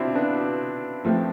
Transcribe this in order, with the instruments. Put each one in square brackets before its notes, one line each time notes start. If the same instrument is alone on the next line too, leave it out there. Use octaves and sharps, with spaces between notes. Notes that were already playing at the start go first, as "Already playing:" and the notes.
Already playing: [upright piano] B2 D5 [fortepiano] C4 D4 E4 F4
[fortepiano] B3 D4
[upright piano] A2 F3 A3 C4